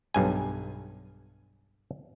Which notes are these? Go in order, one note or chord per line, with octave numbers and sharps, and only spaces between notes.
B1 G2 G#5